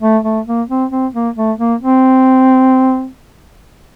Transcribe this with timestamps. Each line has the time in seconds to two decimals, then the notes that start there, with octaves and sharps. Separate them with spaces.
0.02 A3
0.24 A3
0.47 A#3
0.69 C4
0.91 C4
1.14 A#3
1.36 A3
1.59 A#3
1.81 C4